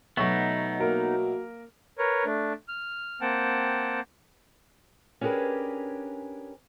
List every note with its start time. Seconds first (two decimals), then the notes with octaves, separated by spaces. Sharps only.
0.17 B2 F#3 A3 B3 D#4 A#5 C#6
0.80 A#3 F#4 A#4
1.98 A#4 B4 C#5
2.25 A3 D4
2.68 F6
3.21 A#3 C4 F#5 G5 A5
5.21 C#4 D4 G4 G#4 A#4 B4